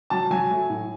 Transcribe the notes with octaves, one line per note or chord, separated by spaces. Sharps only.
F#3 A5
F#3 G#5
A3
A2